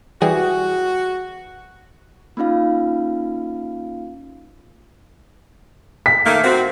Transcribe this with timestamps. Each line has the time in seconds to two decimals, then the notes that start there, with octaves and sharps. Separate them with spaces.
0.22 E3 G3 F#4 G#4
2.37 A#3 C#4 D#4 F4 F5
6.06 B6
6.25 D#3 A3 A#3
6.44 C4 F#4